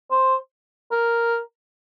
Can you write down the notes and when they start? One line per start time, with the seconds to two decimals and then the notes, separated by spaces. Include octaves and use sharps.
0.11 C5
0.91 A#4